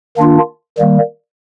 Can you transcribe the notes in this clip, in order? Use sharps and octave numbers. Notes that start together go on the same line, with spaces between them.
D#3 A#3 D4 F4
D#3 G3 A#3